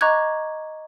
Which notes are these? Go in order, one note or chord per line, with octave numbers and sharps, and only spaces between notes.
D#5 A#5 C#6 D6 F#6 G#6